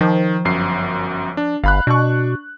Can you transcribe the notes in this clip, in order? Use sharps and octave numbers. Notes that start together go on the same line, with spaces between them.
D#3 F3
G1 F#2 C7
D4
G1 F5 B5 F#6
B2 D4 C#6